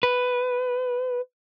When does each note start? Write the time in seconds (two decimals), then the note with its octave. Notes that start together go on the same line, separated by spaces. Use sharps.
0.03 B4